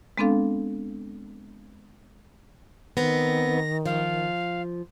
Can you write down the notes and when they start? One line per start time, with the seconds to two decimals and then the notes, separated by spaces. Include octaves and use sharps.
0.18 G#3 B3 C4 D4 A4 F5
2.97 D#3 B3 C4 A#6
3.86 F3 F5